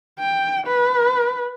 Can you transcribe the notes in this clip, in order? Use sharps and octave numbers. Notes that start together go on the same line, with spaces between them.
G5
B4